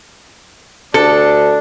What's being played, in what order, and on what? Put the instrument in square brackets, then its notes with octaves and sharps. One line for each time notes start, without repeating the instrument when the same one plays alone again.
[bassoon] D2 [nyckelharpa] D4 [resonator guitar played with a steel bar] A4